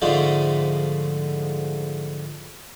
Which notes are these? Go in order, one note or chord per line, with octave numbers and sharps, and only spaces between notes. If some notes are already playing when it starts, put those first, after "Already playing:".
G#2 D3 F3 A3